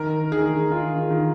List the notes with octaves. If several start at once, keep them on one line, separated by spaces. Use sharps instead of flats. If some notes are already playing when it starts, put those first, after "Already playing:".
Already playing: D#3 A#4
D#3 G#4
D#3 F4
D#3